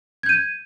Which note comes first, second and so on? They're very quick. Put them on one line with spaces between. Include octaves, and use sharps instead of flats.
G#6 G6 D#7